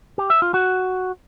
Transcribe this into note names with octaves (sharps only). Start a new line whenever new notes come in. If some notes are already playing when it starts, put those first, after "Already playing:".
G4
E5
F4
F#4